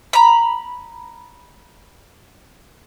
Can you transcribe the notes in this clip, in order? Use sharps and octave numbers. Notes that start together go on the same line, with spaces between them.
A#5 B5